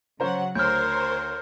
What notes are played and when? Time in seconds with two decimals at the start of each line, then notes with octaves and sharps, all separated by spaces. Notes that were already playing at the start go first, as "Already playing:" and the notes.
0.20 C#3 F#3 C#4 C5 F#5 A#5
0.55 D2 A#4 C5 C#5 F6 G6